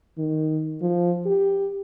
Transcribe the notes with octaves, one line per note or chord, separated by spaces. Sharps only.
D#3
F3
G4